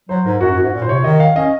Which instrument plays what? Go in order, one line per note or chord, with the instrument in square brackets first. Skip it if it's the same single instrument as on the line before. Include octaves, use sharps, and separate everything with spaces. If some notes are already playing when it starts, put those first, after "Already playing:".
[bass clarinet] F#3 [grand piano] C5
[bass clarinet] G#2 [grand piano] A#4
[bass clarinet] F#2 [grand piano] F#4
[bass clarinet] F#2
[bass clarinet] G#2 [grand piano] F#4
[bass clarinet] A#2
[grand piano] C5
[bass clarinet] C3 [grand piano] C#5
[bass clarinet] D#3 [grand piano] D#5
[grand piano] F5
[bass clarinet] C#4 [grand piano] D#5